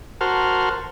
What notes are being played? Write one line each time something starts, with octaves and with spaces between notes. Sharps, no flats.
F#4 A#4 C5 A5 F6